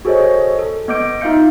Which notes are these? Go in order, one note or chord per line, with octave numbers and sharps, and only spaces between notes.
F#4 G#4 A4 C5 C#5 D#5
A4
B3 D#5 D6 G6 D7
D#4 F4 E5 F5 G6 C#7